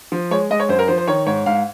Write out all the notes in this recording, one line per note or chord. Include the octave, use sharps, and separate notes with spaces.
F3
G#3 C#5
G#3 D#5
C#5
F#2 C5
A#4
F3 C5
C5
D#3 C#5
G#2 C#5
G#2 F5